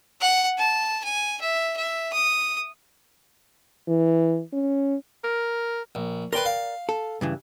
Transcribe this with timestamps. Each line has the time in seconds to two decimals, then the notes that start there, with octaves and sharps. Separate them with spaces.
0.21 F#5
0.58 A5
1.04 G#5
1.41 E5
1.77 E5
2.13 D#6
3.88 E3
4.53 C#4
5.24 A#4
5.95 A#1
6.33 A#4 B4 D5 G5 C6
6.45 F5
6.89 A4
7.21 G2 C#3 E3